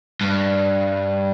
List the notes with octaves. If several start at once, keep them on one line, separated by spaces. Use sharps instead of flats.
G2